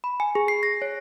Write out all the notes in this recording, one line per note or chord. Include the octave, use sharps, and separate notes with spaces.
B5
G#5
G#4
C7
A#6
C#5